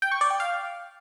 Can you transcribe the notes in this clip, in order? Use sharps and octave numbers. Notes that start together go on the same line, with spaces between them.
G5
C#6
D5
G5
F5